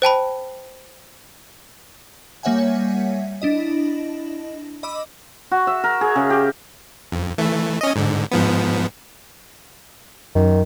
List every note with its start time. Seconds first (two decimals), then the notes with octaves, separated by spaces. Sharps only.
0.02 C5 G5 A5 B5
2.43 G3 A#3 C#5 E5 F#5 G#5
3.42 D4 E4 D#5
4.83 D#5 B5 D6 E6
5.51 F#4
5.67 E5
5.84 A#4
6.01 G#4
6.16 C#3
6.30 G4
7.12 F2
7.38 E3 A3
7.81 C#4 D#5
7.96 G#2 D3
8.31 G#2 F3 B3
10.35 F#2 D#3